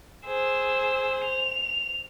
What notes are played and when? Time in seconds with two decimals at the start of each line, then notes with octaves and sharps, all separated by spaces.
0.27 G#4 C5 E6
1.24 F7